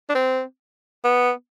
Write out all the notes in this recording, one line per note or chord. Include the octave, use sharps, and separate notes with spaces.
D4
C4
B3